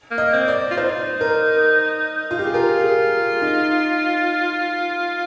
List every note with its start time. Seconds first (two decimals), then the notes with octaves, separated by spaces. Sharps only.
0.11 A#3
0.18 D#5
0.33 C4
0.48 D5
0.71 F4
0.77 D#4 C5
1.21 A#4
2.31 F4
2.39 G4
2.47 G#4
2.54 F4 A#4
2.84 G#4
3.42 D#4